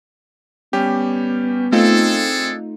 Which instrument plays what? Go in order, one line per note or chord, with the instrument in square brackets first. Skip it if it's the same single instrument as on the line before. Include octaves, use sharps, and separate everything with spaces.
[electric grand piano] G3 C#4 G4 [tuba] B3
[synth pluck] A3 D#4 F4 [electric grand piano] C4 [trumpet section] D4 G#4 A4